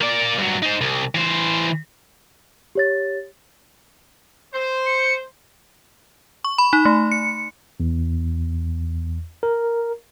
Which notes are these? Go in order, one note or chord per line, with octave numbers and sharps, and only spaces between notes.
A#3 D5
G2 F#3
D#4 C5
C2
E3 C5
G4 C#5 A6
C5
C#7
C#6
B5
D#4
A3
C#7
E2
A#4